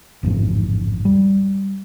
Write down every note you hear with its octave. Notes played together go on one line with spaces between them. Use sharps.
A1 F2 G#2 F3
G3